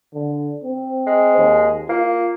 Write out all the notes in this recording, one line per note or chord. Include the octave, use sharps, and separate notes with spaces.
D3
C4
G#3
D#2
A#3 F4